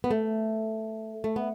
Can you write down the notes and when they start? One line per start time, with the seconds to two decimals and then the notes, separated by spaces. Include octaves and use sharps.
0.04 B3
0.11 A3
1.24 A3
1.36 B3